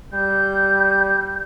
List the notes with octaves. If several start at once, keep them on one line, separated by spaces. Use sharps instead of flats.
G3 G6